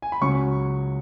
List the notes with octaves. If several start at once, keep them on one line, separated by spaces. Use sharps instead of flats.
G#5
B5
C#2 C#3 F#3 C#4 C#6